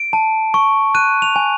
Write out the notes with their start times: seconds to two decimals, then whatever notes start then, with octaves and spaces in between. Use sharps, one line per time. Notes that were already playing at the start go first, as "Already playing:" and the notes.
Already playing: D7
0.13 A5
0.54 C#6
0.95 F#6 D#7
1.22 F7
1.36 G#5